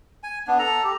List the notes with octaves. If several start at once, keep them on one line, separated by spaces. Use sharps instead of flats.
G#5
B3 D4
A4 A#5
G4